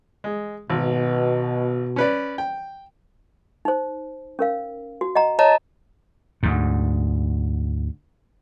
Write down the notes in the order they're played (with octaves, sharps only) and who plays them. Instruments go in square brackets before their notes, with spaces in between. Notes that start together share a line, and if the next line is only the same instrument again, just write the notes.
[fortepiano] G#3
[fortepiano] G#1 [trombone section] B2
[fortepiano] C#4 B4 D5
G5
[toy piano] D#4 C5
C#4 A#4 F5
F#4
D#5 F#5 A#5
[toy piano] C#5 [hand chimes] D#5 A5 A#5
[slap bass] D2 G#2